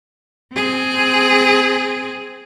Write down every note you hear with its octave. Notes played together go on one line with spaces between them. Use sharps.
C4 G#4